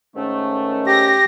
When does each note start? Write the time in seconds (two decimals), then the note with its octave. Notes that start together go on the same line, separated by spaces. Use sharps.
0.16 G#2 D#3 A3 C#4
0.87 G4 A#6